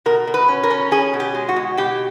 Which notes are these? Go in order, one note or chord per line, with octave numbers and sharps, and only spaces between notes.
B2 A#4
B2
B4
C#4
A#4
C#4
C#4 G#4
B2
G4
G#3
F#4
B2
B2 G4